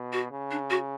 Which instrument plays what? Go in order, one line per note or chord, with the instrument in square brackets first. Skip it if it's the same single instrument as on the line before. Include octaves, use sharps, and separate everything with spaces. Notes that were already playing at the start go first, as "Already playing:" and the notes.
Already playing: [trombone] B2
[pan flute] F#4
[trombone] C#3
[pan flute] D4
F#4